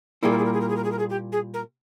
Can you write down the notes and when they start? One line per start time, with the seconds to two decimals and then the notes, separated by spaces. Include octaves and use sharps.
0.23 A#2 G3 A#3 E4 G#4
0.31 A#4
0.38 G#4
0.45 A#4
0.53 G#4
0.61 A#4
0.69 G#4
0.76 A#4
0.84 G#4
0.92 A#4
0.99 G#4
1.10 G4
1.32 G#4
1.54 A#4